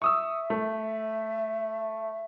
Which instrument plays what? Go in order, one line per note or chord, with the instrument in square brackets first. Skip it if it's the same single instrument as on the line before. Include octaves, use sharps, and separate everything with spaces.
[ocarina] E5 [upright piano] C#6 D#6 E6
[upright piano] A3